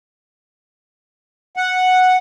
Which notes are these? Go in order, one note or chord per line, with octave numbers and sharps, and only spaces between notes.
F#5